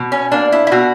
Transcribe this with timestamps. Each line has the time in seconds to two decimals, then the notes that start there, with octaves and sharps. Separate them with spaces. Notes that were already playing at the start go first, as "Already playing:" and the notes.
Already playing: B2
0.12 C#4
0.32 A#3 D4
0.52 E4
0.67 E4
0.71 B2 F#4